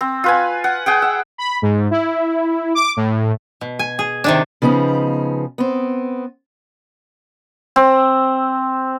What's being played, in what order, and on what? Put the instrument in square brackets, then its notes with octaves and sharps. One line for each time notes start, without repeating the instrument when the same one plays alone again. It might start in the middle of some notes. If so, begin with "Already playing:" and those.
[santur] C4
F4 B4 G#5
F#5
G#4 F#5 G5
E5
[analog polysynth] B5
G#2
E4
D6
A2
[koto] B2
G#5
G#4
C3 D#3 D4
[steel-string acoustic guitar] C#3 F3 B3 D#4
B3 C4
[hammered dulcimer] C4